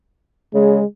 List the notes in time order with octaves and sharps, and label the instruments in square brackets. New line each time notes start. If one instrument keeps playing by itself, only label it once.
[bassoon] C#3 [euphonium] G#3